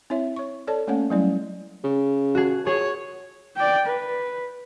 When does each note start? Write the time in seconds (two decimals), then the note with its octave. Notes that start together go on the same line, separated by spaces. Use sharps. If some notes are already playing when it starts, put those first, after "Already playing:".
0.10 C4 E4 C#5 E5
0.36 C#5 C#6
0.67 A4 C#5 D5 A5
0.88 A3 A#3 C#4 C#5 F#5
1.10 F#3 G3 A3 C#4 E4 D5
1.84 C#3
2.35 F#4 G#4
2.67 G#4 C#5
3.57 D5 G5
3.87 B4